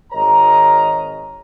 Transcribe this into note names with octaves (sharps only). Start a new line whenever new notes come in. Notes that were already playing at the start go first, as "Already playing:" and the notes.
G#1 G#4 A#4 C#5 D#5 A#5